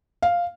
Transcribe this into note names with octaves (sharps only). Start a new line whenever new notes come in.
F5